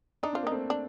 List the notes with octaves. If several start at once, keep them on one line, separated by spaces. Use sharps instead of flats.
D4 D#4
C4 F4
A#3 D#4
A3 C4
D4